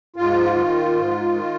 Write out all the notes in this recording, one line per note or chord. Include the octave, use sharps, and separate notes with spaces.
G#2 F4
D#3
G#2
D#3